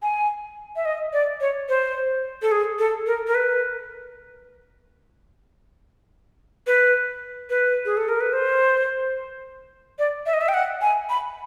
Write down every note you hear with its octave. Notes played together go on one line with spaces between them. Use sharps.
G#5
E5
D#5
D5
C#5
C5
A4
G#4
A4
A#4
A#4
B4
B4
B4
G#4
A4
A#4
B4
C5
D5
E5
D#5
E5
G5
F#5
G#5
B5